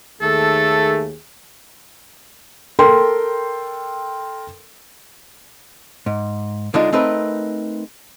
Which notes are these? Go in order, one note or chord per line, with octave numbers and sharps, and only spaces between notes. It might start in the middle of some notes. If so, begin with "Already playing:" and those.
D#2 A3 G#4 A4
A4 A#4 G5 C6
G#2
D2 D3 G#3 D4 D#4 F4
A3 C4 D#4 A#4 B4